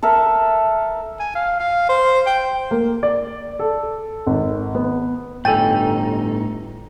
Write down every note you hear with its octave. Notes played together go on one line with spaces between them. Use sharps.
A4 A#4 E5 F#5
G#5
F5
F5
C5
G5
A#3
D5
A4
G#1
B3
G1 A2 D#4 A4 G5 G#5 A6